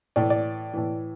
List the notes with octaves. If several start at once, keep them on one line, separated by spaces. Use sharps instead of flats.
A2 E3 D5
D5
A2 E3